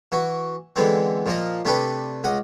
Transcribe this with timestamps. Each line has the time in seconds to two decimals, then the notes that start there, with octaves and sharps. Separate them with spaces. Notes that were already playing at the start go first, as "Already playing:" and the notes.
0.12 E3 F#4
0.76 D3 E3 G#3 B3 C4
1.26 A#2 F3 A#3 D#5
1.65 C3 A3 D4 G4 A4 B4
2.24 C#2 D#5 F#5